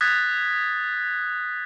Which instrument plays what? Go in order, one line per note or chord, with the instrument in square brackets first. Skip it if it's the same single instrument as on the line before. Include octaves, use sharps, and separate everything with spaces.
[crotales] D#6 F#6 G#6 A6 B6